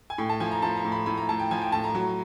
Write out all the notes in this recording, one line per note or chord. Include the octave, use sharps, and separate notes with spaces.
G#5
A2 G5
A5
F3 G#5
A#5
F3 A5
A#5
A2
B5
A2 B5
A#5
A2 A5
G5
F3 G#5
G5
A2 A5
A#5
F#3